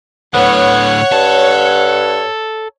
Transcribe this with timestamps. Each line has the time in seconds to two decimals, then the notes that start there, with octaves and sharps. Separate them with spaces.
0.34 A2 D3 B3 C#5 F#5
1.12 G2 A4